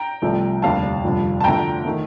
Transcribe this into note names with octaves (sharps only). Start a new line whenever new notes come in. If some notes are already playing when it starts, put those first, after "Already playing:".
Already playing: G5 A#5
C2 C3 F3 A3
F1 D#2 D3 G3 F5 A5
F1 F2 D3 G3
A5
D2 D3 F3 A3 G5 A#5
D#3 A3